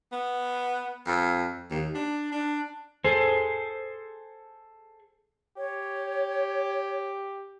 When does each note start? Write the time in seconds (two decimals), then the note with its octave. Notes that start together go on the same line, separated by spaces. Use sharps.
0.12 B3
1.07 F2
1.71 D#2
1.95 D4
2.32 D4
3.04 G#4 A4 C5
5.57 G4 C#5